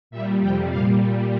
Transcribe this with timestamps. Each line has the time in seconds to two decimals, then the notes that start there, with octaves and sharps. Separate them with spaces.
0.11 A#2 G3 E5
0.40 F2 C3 G3 G5
0.70 A#2 G3 F5